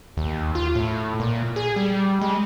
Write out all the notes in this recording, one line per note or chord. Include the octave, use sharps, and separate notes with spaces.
D#2
F4
A2
A#2
G#4
G3
G#3